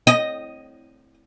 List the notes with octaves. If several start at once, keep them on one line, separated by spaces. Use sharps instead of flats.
D#5